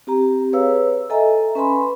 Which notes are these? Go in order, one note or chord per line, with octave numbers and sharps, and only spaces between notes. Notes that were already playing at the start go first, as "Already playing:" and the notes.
C4 G4 A#5
G#4 B4 C#5 F5 E6
A4 D#5 E5 G#5 A#5
C#4 B4 G#5 B5 C6